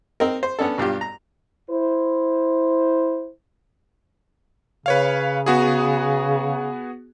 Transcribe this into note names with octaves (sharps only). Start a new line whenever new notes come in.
C4 D#4 A#4
C5
B3 C#4 D4 A4
B1 G2 F4 G4
A#5
E4 C5
C#3 B4 C#5 F5
B3 F#4 G#4